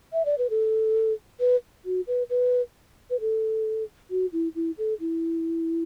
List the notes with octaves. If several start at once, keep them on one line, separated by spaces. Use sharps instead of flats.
E5
D5
B4
A4
B4
F#4
B4
B4
B4
A4
F#4
E4
E4
A4
E4